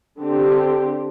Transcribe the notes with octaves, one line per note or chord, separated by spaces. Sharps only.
D3 C4 G4